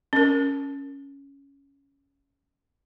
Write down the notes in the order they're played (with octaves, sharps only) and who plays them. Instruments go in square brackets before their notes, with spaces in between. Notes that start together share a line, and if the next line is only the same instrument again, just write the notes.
[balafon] C#4 A#4